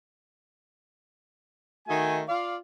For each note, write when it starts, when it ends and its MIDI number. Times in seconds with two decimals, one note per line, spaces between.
1.88 2.21 51
1.88 2.21 57
1.88 2.21 63
1.88 2.21 66
1.88 2.21 80
2.28 2.55 65
2.28 2.55 74
2.28 2.55 77